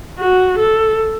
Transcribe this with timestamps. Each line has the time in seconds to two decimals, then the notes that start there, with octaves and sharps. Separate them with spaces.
0.18 F#4
0.58 A4